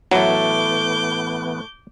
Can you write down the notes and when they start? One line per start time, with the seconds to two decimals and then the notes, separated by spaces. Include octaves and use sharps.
0.11 A2 E3 F#3 A3 B3 D6 G6